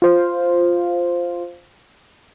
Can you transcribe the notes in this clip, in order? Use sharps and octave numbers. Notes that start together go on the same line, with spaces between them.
F4 C5 F5